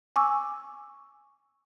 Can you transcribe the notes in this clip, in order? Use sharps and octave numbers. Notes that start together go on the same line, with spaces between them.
G#5 C#6 D6 E6